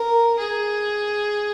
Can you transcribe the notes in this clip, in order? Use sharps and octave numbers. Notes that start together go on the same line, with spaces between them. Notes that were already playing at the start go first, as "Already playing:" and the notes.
Already playing: A#4
G#4